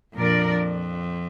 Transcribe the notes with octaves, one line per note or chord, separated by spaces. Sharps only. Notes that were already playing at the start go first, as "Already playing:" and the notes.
F2 A#2 F3 D4 A#4 D5